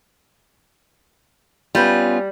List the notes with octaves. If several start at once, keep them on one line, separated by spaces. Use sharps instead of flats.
G3 B3 C#4 F4